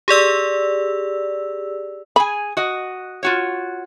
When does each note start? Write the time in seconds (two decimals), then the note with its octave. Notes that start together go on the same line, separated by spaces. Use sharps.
0.08 G4 G#4 D5 E6
2.16 G#4 G#5 B5
2.57 F#4 D#5
3.23 F4 F#4 C#5